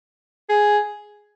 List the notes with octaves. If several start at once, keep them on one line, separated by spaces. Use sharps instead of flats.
G#4